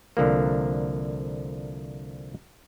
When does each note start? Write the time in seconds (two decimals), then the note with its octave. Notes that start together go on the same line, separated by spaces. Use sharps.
0.17 C2 D3 F3 A#3